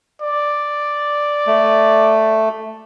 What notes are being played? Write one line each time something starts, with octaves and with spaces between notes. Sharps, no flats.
D5
A3